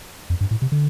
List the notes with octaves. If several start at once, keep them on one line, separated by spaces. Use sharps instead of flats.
F2
G2
A2
C3
D3